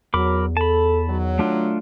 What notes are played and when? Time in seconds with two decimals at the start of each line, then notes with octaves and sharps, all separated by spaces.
0.14 E2 F#3 A#4 B5 D6
0.57 A4 A5 B5
1.09 D#3 F#3
1.39 A3 D4 F4